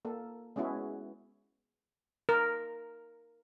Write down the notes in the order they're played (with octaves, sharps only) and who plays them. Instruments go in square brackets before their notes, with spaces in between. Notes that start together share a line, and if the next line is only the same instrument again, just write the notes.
[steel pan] A#3 A4
G#3 B3 C#4 E4 F#4 G#4
A#4